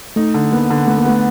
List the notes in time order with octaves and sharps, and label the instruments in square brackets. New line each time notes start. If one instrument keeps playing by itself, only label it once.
[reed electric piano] A3 [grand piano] D#4
[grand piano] D3
[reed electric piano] A#3 [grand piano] B3
[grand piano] D3
[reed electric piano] A3 [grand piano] B3
[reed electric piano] A#3
[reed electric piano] A3 [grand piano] B3